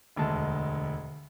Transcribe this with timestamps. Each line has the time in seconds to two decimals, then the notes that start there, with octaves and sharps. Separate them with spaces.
0.16 E1 D2 G#3 A5